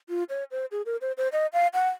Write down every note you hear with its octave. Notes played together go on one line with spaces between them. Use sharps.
F4
C#5
C5
G#4
A#4
C5
C5
D#5
F5
F#5